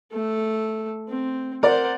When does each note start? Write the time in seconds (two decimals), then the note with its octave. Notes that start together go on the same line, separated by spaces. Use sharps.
0.13 A3 A4
1.08 C4
1.63 A#4 C5 D5 F#5